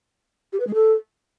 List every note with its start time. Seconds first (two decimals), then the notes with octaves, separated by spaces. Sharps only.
0.52 G4
0.60 B4
0.67 G#3
0.74 A4